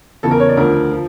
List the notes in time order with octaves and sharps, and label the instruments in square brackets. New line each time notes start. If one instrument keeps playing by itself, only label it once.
[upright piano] E2 C#3 E3 A4
A#4
C#5
D5
D2 D3 F3 A#4
F3